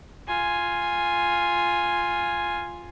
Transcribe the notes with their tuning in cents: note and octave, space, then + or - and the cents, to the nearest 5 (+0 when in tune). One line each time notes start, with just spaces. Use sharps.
F4 +0 G#5 -5